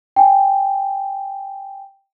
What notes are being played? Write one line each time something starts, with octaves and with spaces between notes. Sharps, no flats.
G5 G#5